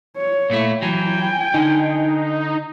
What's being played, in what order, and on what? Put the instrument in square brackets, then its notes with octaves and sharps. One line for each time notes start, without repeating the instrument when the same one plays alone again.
[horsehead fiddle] C#5
[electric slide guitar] A#2 A3 E4
[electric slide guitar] E3 F#3 [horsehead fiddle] G5 G#5
[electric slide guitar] D3 [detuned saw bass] D#4